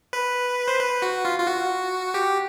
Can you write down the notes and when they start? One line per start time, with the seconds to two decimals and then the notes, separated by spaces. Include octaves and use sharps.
0.13 B4
0.68 C5
0.80 B4
1.02 F#4
1.25 F4
1.39 F4
1.47 F#4
2.14 G4